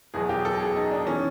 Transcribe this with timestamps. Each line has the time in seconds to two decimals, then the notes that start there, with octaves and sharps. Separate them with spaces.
0.14 E2 B2 F#3 G#4
0.29 G4
0.45 A4
0.60 G#4
0.76 D#4
0.91 D4
1.06 E3 C#4